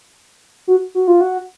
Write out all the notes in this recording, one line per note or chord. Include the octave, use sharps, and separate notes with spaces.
F#4
F#4
F4
F#4